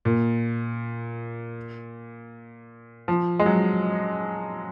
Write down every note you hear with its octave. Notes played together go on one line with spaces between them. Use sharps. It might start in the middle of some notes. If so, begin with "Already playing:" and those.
A#2
F3
G#3
F#3